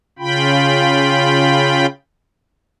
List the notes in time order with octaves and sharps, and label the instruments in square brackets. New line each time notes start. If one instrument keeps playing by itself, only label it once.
[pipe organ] C#3 F4 G5 B5